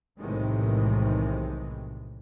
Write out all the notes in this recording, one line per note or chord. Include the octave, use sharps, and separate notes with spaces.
B1 A2 C3 D#3 E3 G#3